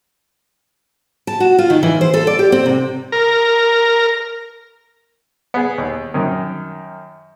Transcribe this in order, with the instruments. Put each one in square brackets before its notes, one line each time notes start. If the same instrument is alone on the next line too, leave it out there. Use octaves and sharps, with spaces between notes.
[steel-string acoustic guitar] A5
F#4
F4
D#3
E3
C5
A4
D5
G4
C4
C3
[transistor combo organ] A#4
[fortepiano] B3 G#4
D#2
F#2 D#3